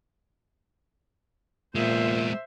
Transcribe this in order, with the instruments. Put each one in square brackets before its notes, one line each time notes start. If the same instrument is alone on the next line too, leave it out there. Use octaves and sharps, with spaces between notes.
[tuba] A#2 [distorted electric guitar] G#3 B3 [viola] C5 E5